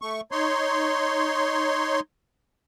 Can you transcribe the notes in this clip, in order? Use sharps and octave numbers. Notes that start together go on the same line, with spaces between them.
A3 C#6
D#4 C#5 C6